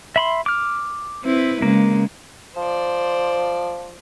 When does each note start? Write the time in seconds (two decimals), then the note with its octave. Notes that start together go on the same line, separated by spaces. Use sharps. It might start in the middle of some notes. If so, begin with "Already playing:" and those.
0.16 E5 B5 C6
0.46 D6 F6
1.24 C4 E4 B4
1.62 C#3 G#3 A#3
2.56 F3 C5 D5